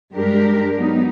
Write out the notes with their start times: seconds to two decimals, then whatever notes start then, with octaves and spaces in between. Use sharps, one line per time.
0.13 G2 G#3 D4 G4 A#4
0.78 F#3 B3 D#4